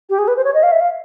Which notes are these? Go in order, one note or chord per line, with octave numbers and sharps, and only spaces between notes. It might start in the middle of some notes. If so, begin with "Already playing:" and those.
G4
G#4
B4
C5
C#5
D#5
F5
E5
F5